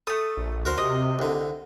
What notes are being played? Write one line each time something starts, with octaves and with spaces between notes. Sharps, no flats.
A3 A4 D#6
A#1
D2 F#4 A#4 C5
C3 D#5
C2 D3